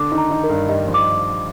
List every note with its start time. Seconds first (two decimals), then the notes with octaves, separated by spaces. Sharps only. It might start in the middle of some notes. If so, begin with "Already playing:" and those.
Already playing: D3 D4 D6
0.12 D#3 D#4
0.18 A#5
0.31 D#3 D#4
0.44 A#4
0.50 G2 G3
0.69 G2 G3 D#5
0.87 F3
0.94 D6